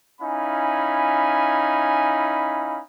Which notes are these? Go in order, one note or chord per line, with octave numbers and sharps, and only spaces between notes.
C#4 D#4 E4 F5 G#5 B5